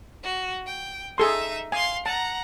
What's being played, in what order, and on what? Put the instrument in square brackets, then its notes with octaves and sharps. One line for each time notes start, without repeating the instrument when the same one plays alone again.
[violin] F#4
G5
[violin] D#4 E5 [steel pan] G#4 A4 C6
[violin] F5 C6 [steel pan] G#5
[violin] F#5 A#5 [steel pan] A5